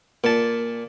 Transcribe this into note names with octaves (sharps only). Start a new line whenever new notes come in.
A#2 A5